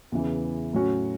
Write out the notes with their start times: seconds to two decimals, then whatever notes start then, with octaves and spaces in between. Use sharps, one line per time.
0.12 E2 C#3 E3
0.73 A2 F#3 C#4 F#4